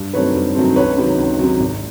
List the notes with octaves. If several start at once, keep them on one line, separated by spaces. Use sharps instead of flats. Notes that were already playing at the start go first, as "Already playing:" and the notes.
Already playing: G2
D#3 F#3 A3 C4 B4 C#5
G2
D#3 F#3 A3 C4
C#2 B4 C#5
C3 D#3 F#3
C#2
C3 D#3 F#3
G#1